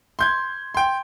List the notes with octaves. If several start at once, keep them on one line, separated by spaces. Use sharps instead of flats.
C6 G6 G#6
G5 C6